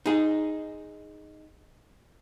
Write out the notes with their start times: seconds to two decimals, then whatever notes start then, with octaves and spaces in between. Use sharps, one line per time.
0.06 D#4 G#4